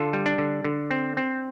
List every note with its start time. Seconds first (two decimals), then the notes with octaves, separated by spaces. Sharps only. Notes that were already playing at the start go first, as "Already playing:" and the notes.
Already playing: D3 F4 A4
0.13 G3
0.26 D4
0.38 D3
0.64 D3
0.91 C4
1.17 C4